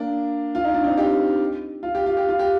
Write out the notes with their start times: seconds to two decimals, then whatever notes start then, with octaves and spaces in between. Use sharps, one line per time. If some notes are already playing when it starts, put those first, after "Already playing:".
Already playing: A#3 D4
0.55 F4
0.65 D#4
0.74 D4
0.84 C4 D#4
0.97 D#4 G4
1.83 F4
1.95 G4
2.06 F4
2.17 G4
2.29 F4
2.39 G4